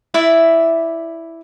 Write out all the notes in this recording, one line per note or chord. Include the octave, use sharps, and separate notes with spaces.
E4 D5 E5